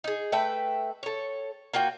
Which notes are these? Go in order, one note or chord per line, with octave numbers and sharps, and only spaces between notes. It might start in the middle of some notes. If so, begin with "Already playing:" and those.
D#4 G#4
A3 B4 E5 G5
A4 C#5
A#3 F4 F#4 G5